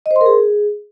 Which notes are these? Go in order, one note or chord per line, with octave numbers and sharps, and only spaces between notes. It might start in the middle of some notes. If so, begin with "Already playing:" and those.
D#5
C5
C6
A#4
G#4